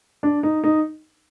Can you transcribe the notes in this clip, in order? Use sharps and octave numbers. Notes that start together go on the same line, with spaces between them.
D4
D#4
D#4